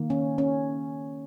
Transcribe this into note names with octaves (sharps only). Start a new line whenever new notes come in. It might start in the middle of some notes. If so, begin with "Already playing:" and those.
Already playing: D#3 A#3
C#4
C#4